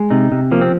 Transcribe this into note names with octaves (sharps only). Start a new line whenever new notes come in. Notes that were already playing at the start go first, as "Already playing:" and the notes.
Already playing: G#3
C3 D#4
C3
F3 A#3
C4